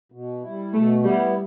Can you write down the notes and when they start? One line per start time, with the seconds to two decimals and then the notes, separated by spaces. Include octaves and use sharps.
0.12 B2
0.42 G3 E4
0.74 B2 A3
1.04 G3 B3 E4